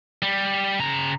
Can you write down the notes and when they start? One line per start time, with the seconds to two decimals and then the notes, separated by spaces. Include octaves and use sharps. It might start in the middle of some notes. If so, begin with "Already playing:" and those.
0.22 G3
0.80 C#3 A#5